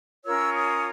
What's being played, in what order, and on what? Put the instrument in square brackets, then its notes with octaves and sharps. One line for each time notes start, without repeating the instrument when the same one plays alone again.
[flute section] C#4 F4 A#4 C#5 E6
D#6